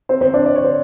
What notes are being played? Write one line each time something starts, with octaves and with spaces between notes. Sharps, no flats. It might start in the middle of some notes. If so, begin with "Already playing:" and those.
C4 C5
C4 C5
D4 D5
D5
C#5
C5